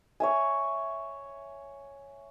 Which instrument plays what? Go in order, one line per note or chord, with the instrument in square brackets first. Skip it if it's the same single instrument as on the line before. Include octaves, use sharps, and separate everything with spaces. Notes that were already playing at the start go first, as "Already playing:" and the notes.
[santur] C#5 E5 G#5